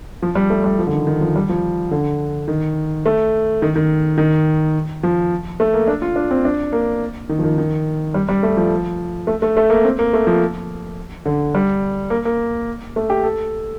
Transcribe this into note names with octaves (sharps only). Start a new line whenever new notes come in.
F3
G3
A3
G3
F3
D3
D#3
D#3
F3
G3
F3
D3
D#3
A3
D#3
D#3
D#3
F3
A3
A#3
D4
F4
D4
C4
D4
A#3
D#3
F3
D#3
D#3
G3
G3
A3
F3
A3
A3
A3
A#3
C4
A#3
A3
F3
D3
G3
A#3
A#3
A3
G4
A4